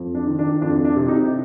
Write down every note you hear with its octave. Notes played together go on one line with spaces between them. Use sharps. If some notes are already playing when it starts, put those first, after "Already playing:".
Already playing: F2
D4
D#3
D4
F2 D4
D4
C3
D#4